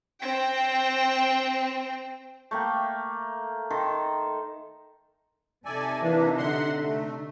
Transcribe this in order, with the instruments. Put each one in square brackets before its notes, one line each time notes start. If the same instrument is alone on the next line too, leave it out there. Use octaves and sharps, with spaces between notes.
[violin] C4 G5
[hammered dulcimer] A3 A#3 G5
D#3 A4 C6
[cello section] C3 D#4 E5 [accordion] A4 D5 G#5
[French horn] E3 [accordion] A#3 D4
[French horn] D3 [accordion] F#5 C6
[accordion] A3